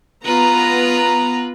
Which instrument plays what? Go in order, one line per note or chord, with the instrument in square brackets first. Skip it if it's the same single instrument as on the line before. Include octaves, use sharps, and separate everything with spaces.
[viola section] B3 A#5 [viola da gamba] F4 B4